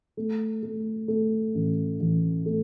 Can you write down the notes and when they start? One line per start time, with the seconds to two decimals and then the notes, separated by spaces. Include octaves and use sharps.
0.17 A3
0.63 A3
1.08 A3
1.55 A1
2.00 A1
2.46 A3